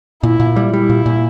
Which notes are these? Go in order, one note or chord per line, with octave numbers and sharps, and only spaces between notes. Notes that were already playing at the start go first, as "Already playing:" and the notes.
A#2 E4
A#2
G3
G3 E4
A#2
A#2